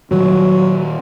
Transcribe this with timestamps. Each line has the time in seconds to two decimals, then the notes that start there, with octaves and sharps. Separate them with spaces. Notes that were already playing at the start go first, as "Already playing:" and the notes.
0.11 A#2 D#3 F#3 G3